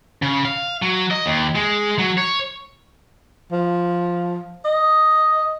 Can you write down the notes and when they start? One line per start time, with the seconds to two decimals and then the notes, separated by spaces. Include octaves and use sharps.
0.22 C#3
0.45 F5
0.82 F#3
1.11 D#5
1.26 D#2
1.55 G#3
1.98 F#3
2.18 C#5
3.52 F3
4.65 D#5